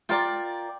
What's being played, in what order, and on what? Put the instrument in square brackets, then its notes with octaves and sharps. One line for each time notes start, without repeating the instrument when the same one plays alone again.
[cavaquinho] F4 A#4 D5 G5